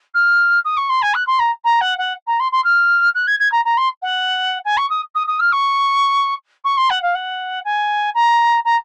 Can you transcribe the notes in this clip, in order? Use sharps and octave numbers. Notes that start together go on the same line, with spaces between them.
F6
D#6
C#6
C6
G#5
F#6
C6
A#5
A#5
F#5
F#5
A#5
C6
C6
F6
F#6
G#6
G#6
A#5
A#5
C6
F#5
G#5
C#6
D#6
D#6
D#6
F6
C#6
C#6
C6
F#5
F5
F#5
G#5
A#5
A#5